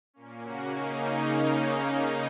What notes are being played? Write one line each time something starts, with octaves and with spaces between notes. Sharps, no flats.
A#2 A#3 C#4
C#3 A#3 C#4 F#4
C#3 A#3 C#4 D#4